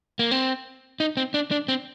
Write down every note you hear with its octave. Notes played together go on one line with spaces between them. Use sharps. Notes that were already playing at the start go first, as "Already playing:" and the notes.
A#3
C4
D#4
C4
D4
D4
C4